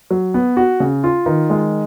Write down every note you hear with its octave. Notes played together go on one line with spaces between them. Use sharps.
F#3
B3
F#4
C#3
F4
D#3
G#3